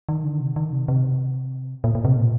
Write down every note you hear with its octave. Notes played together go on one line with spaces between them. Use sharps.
D#3
D3
C3
D#3
C3
C3
A#2
A#2
C3
A#2